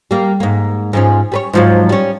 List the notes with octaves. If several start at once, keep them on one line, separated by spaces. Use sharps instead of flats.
G3 A#3
G#2 A#3
G#2 F3 C#4
G3 B4 C#5
G#2 F3 F#3
G3 C#4